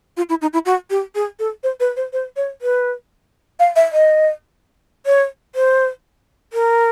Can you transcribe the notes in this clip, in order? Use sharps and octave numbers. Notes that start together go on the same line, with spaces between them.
F4
E4
D#4
E4
F#4
G4
G#4
A4
C5
B4
C5
C5
C#5
B4
F5
E5
D#5
C#5
C5
A#4